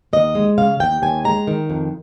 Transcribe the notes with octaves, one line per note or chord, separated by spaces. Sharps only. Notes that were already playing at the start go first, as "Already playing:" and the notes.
D#2 D#5
G#3
C#3 F5
D#2 G5
D#2 G#5
G#3 A#5
D#3
F2